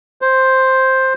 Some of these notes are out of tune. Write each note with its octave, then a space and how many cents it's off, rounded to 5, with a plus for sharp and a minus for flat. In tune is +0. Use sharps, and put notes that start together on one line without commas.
C5 +5